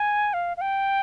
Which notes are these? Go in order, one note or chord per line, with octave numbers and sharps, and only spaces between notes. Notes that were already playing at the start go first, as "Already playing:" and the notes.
Already playing: G#5
F5
F5
G5